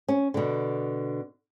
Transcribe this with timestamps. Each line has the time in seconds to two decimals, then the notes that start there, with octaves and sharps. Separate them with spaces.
0.08 C#4
0.34 B2 D3